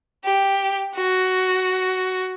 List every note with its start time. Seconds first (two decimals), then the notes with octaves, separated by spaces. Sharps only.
0.24 G4
0.95 F#4